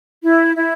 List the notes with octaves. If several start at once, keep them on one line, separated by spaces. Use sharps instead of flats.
E4
E4